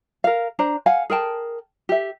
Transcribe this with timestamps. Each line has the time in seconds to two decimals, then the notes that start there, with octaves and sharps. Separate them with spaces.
0.24 A#4 F5
0.59 D4 C5 A#5
0.86 F5 F#5 G#5
1.10 G#4 A#4 G5 A5
1.89 G4 E5